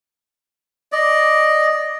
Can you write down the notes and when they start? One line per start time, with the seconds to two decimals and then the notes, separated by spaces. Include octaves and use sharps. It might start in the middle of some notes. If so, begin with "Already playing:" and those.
0.92 D5 D#5